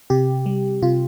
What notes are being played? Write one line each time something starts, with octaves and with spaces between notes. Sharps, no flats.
C3 G4
G3
C3 F4